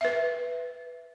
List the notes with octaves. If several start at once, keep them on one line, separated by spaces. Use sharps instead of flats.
B4 E5